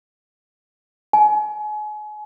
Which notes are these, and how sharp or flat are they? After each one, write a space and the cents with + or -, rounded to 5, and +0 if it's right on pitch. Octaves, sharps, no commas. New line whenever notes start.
G#5 +35